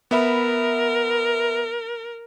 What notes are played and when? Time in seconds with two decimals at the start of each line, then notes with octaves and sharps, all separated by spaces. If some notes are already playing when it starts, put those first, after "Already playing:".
0.11 B3 A#4 E5 B5